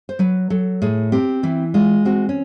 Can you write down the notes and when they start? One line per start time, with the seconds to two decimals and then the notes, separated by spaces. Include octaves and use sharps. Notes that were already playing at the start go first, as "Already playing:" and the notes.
0.09 C5
0.19 F#3 B4
0.50 F#3 A4
0.82 A2 G#4
1.12 C4 G4
1.43 E3 E4
1.74 G#3 F4
2.05 C4 F#4
2.29 C#4